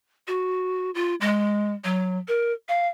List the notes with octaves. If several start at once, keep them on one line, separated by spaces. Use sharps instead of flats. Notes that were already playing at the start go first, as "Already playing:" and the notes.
F#4
F4
G#3
F#3
A#4
F5